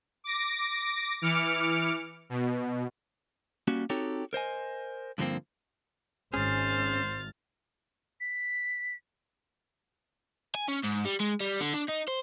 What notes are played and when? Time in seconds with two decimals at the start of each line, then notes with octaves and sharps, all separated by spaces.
0.24 D6 A#6
1.22 E3 D6 F6 C#7
2.30 B2
3.68 G3 A#3 C#4 F#4
3.90 C4 D#4 F#4 G4 A4 C#5
4.33 A#4 C5 D#5 G#5
5.18 G2 D3 F3 G3 A#3 C4
6.34 G#1 C#4 G#4 C5 F6 A6
8.21 B6
10.55 G#5
10.68 C#4
10.84 G#2
11.05 G3
11.20 G#3
11.40 G3
11.60 D3
11.73 D4
11.88 D#4
12.08 C5